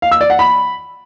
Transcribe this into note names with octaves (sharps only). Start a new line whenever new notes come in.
F5
E6
D5
F#5
B5